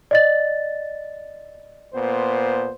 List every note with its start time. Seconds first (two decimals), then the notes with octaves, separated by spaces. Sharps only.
0.11 D5 D#5 A6
1.94 A#2 B3 C5